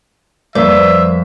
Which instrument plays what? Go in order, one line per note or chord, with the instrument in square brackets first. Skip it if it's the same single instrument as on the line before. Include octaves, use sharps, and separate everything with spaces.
[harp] F2 [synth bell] G3 D5 [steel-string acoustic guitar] A#3 C4 B4 [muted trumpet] E5